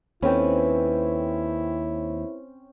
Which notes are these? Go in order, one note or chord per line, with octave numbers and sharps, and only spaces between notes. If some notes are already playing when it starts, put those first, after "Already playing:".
D#2 C4 C#4 E4 A4 B4